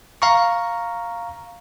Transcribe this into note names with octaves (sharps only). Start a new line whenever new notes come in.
F5 A#5 C#6